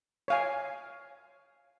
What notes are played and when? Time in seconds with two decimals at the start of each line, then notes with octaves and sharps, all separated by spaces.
0.28 C#5 F5 G#5